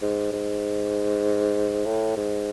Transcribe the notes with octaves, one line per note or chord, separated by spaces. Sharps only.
G#2
G#2
A2
G#2